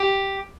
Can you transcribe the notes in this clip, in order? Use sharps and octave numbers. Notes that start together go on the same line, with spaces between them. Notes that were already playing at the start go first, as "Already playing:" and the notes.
Already playing: G4